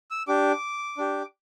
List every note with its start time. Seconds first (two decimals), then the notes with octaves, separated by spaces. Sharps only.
0.11 E6
0.27 D4 G4 D6
0.98 D4 G4